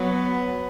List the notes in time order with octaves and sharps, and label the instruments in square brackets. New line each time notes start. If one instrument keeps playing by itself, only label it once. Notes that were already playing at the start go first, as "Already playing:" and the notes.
Already playing: [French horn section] F#3 [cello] B3